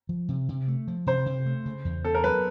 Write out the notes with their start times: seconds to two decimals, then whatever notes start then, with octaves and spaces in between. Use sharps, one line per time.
0.09 F3
0.29 C3
0.49 C3
0.68 A3
0.88 F3
1.07 C3 C5
1.26 C3
1.46 A3
1.66 C#3
1.85 E2
2.04 B3 A4
2.15 A#4
2.24 F#3 B4